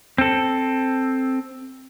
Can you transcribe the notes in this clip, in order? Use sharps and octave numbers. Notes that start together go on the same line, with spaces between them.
C4 A4